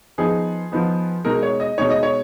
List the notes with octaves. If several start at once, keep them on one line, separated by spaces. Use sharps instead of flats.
F3 B3 D#4 G#4
F3 B3 D#4
B2 G#3 D#4 A#4
C#5
D#5
B2 G#3 D#4 C#5
D#5
C#5